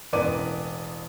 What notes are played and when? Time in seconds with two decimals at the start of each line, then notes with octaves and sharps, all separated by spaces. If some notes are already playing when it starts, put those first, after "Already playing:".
0.13 E1 A1 B4 D5 D6 D#7